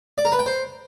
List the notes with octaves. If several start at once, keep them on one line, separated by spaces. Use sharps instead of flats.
D5
A#4
B4
G5
C5